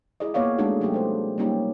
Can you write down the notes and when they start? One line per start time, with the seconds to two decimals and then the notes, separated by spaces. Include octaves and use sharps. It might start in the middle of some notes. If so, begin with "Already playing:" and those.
0.20 E4 G#4 D5 D#5
0.34 A#3 B3 C#5 D5 F5
0.58 G#3 A3 D4 D#4 F#4 G#4
0.80 C3 F#3 A3 C#4 F#4 G4
0.94 B4 C5
1.38 G3 A3 A#3 C#4 D#4 G4